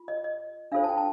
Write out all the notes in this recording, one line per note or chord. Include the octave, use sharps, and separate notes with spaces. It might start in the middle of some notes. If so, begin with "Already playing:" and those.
Already playing: F4
D#5
D#5
D4 F4 A4 C5 F5
A5
G5
A5